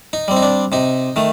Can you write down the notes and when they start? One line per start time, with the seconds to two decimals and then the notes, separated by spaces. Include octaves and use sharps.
0.13 D#4
0.28 G3 C4
0.37 D#4
0.42 D4
0.72 C3 D#4
1.16 D#3 A3